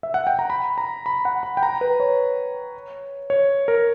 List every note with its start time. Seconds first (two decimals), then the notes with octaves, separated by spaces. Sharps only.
0.03 E5
0.14 F#5
0.27 G5
0.39 A#5
0.50 B5
0.78 A#5
1.06 B5
1.25 F#5
1.43 B5
1.57 G5
1.63 A#5
1.81 B4
2.00 C#5
3.30 C#5
3.68 A#4